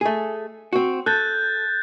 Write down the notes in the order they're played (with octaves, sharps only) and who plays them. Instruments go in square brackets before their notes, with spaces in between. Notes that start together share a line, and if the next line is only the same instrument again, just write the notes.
[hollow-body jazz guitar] A3 G#4
C4 F#4
[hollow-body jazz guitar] A4 [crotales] F#6 G6 A6